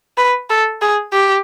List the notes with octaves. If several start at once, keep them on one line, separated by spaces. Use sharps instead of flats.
B4
A4
G#4
G4